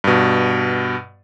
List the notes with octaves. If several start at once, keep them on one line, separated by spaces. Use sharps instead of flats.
G2 B2